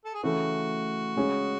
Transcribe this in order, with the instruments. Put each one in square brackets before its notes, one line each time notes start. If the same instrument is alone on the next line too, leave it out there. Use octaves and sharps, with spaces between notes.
[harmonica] A4
G#4
[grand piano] C#3 E3 A3 [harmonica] F#4
[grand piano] C#3 G#3 C#4 G#4